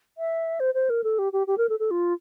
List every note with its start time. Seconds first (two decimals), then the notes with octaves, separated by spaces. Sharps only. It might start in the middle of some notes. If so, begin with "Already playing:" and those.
0.18 E5
0.60 C5
0.74 C5
0.90 A#4
1.04 A4
1.19 G4
1.33 G4
1.47 G4
1.58 A#4
1.69 A4
1.79 A4
1.91 F4